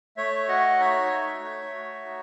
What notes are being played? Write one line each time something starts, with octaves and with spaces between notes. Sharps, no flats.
A3 C#5 E5
F#4 D#5 F#5
D#4 C#5 E5
A3
A3
F#4
D#4